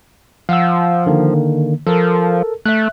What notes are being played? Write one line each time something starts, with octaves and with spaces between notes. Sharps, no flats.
F3 F5 F#5 E6
D3 D#3 A#3
F3 A4 A#4
A3 E5 F#6